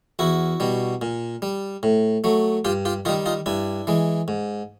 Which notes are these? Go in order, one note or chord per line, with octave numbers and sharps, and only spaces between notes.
E2 E4 F#4
B2 G3
A#2
G3
A2
F#3 A3
G2 F4 G4
F4 G4
D#3 G3 D#4 F4
D#4 F4
G2 D4 E4
E3 G#3
G#2